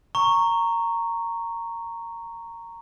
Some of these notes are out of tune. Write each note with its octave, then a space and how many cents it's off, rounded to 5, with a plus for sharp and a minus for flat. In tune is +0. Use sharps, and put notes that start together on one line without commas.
A#5 -10 C#6 +0